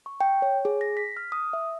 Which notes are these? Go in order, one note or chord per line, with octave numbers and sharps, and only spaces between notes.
C#6
G5
C#5
G#4
A#6
B6
F6
D#6
E5